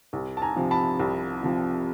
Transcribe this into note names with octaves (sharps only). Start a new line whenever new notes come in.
C2
A5
G#5 A#5
C3 F3
A5 B5
C2
C3 F3